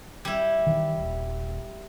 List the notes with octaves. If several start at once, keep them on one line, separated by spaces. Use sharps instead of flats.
G3 E4
D#3 E3
D#1